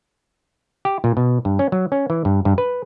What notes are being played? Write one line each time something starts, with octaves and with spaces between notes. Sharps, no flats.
G4
A#2
B2
G2
C#4
F#3
C#4
E3
G2
G2
B4